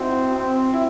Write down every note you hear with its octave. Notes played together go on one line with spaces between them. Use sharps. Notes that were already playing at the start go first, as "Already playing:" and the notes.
Already playing: C4 D#4 E4 F#4
C4
E4